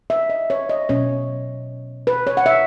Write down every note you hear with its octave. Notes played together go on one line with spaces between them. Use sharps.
E5
D#5
C#5
D#5
B2 F#3 C#4 C#5
B4
C#5
F#5
E5